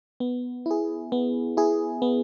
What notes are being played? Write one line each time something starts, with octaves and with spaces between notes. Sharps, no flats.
B3
E4 G#4
B3
E4 G#4
B3